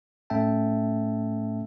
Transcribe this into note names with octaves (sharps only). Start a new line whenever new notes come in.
A2 A3 C#4 E5 G5 A5